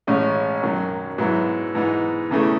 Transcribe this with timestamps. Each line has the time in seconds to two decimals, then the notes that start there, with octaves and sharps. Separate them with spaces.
0.07 A1 A2 G#3 C#4
0.63 F#2 D#3 F#3
1.18 G#2 F#3 B3 E4
1.75 G#2 E3 B3 D#4
2.31 E2 C#3 E3 A3